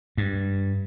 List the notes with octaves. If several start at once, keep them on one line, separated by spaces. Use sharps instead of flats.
G2